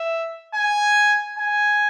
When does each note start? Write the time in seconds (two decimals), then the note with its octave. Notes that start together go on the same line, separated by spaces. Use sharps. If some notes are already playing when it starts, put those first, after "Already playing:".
Already playing: E5
0.55 G#5
1.38 G#5